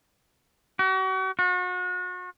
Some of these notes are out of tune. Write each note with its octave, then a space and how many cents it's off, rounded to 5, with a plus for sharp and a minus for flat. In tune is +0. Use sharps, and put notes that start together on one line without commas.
F#4 +40
F#4 -35